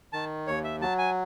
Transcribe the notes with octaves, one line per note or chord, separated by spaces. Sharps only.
D#3 A5
D#2 C#5
E5
F#3 A5
G#5